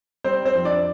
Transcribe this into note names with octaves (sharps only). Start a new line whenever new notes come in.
G3 C4 C5
C4 C5
F2
D4 D5